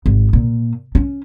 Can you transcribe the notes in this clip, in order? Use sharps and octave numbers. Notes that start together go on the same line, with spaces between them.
G#1
A#2
C#4